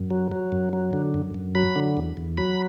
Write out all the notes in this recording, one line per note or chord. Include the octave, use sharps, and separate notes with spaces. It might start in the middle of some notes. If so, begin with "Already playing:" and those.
Already playing: F#2
F#3
F#3
F#2
F#3
D3
F#2
F#2
F#3 B5
D3
E2
E2
F#3 B5